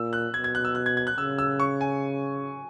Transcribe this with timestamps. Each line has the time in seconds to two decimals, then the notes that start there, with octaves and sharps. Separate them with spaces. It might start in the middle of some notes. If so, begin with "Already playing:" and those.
Already playing: A#2 E6
0.13 F#6
0.34 B2 G#6
0.44 G#6
0.55 F#6
0.65 E6
0.75 F#6
0.86 G#6
0.97 G#6
1.07 F#6
1.17 C#3 E6
1.39 E6
1.60 C#6
1.81 G#5